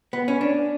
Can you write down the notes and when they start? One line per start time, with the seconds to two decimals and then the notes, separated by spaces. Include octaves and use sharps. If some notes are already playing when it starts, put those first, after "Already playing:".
0.13 B3
0.28 C#4
0.41 D4